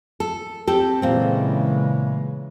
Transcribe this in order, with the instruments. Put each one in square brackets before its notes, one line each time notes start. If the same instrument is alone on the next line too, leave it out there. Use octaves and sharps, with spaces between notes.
[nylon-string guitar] A4
C4 G4 A4
[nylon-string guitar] A#2 C4 [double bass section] C#3 E3 G#3